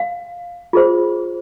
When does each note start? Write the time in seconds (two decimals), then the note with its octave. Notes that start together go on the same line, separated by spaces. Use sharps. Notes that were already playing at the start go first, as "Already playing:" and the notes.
Already playing: F5
0.73 F4 G#4 C5